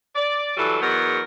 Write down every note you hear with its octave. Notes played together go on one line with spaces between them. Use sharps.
D5
E3 F#3 G3 A4
E2 F#3 G#3 B3 A#4